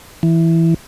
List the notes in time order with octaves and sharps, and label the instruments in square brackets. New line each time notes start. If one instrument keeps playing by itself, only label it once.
[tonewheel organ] E3